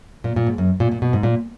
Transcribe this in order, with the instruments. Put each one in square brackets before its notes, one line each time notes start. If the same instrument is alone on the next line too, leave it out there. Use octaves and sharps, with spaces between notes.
[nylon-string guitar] A#2
A#2
G#2
F#2
A#2
A#2
B2
G#2
A#2